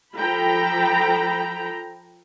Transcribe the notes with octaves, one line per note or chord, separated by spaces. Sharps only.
F3 A4 G5 A#5 B5